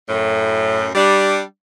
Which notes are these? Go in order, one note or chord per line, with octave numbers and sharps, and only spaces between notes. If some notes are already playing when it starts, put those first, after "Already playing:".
F#2 A2
G3 D4